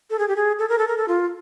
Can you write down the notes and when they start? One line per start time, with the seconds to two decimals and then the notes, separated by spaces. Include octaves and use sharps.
0.10 A4
0.19 G#4
0.28 G4
0.36 G#4
0.59 A4
0.69 A#4
0.78 A4
0.88 A#4
0.98 A4
1.08 F4